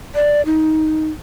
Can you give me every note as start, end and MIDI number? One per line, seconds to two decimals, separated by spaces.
0.15 0.41 74
0.46 1.08 63